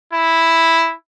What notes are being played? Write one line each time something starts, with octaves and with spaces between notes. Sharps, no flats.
E4